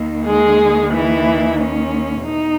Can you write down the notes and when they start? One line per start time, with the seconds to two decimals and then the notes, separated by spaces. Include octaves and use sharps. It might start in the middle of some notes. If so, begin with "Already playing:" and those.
Already playing: D#2 D#3
0.25 G#3 G#4
0.92 E3 E4
1.59 C#4
2.25 E2 B2 D#4